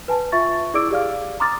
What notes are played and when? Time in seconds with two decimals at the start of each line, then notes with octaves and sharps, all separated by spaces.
0.08 B4 G#5 A5
0.32 F4 E5 C#6 A6
0.74 E4 G#4 D5 D6 E6 D7
0.91 G4 G#4 D5 F5 F6
1.40 A#5 C6 D6 D#6 F6 A6